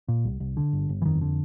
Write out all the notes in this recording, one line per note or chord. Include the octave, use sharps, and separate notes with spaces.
A#2
C2
C2
D3
G1
G1
E3
F2 D#3
D3